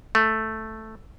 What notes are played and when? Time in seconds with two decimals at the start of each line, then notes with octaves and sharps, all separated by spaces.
0.15 A3